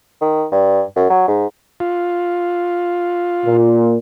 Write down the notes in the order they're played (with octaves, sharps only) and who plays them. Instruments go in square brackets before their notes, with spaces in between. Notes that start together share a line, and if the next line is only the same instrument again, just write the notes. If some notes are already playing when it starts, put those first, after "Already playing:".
[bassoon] D#3
G2
F#2
F#3
G#2
[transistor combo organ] F4
[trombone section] A#2